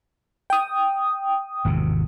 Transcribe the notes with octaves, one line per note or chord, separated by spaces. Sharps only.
G5 D#6
G#1 E2 C3